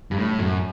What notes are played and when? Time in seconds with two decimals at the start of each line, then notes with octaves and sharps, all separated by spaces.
0.11 G2
0.18 A2
0.39 F#2